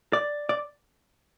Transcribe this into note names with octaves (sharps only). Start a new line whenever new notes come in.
D5
D5